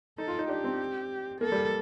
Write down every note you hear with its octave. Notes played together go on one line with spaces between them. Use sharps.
D#4 A4
F4
D#4
D4 G4
C4
A#3 A4
G3